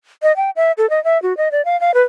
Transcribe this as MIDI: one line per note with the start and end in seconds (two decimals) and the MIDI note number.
0.23 0.35 75
0.36 0.50 79
0.56 0.72 76
0.78 0.89 69
0.90 1.02 75
1.04 1.21 76
1.22 1.36 66
1.37 1.51 75
1.52 1.64 74
1.65 1.79 77
1.81 1.94 77
1.94 2.02 71